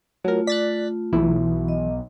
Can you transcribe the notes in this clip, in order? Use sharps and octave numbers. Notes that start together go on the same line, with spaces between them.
F#3 A3 F4 A#4
D5 F#6 A6 B6
B1 E3 E4
D#5